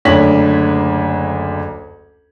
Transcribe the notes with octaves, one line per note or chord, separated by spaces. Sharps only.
F#1 D2 D4 C#5 B6 F#7